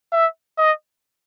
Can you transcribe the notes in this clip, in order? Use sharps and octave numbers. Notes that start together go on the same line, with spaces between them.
E5
D#5